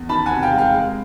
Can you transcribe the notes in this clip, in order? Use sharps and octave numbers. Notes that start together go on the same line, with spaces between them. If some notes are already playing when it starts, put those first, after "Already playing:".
Already playing: E2
D#3 A5 B5
F#5 G#5
C3
F5 G5
G#3
F5 G5
G#3